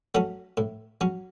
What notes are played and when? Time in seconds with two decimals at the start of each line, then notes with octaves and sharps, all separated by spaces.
0.15 F#3 A3 C#4 F#5
0.57 A2
1.01 F#3 C#4